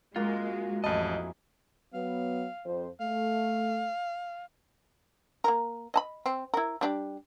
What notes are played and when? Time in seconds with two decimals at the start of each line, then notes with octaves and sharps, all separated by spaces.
0.16 F#2 G#3 A#3 F4 F#4
0.84 A1 F2 D#4 E4 G#4 D#5 A5
1.94 F#3 B3 F5
2.65 F2 C5
3.01 A3 F5
5.44 A#3 A#4
5.94 D#5 A5 B5
6.26 C4
6.54 E4 A#4
6.81 G3 D4 G4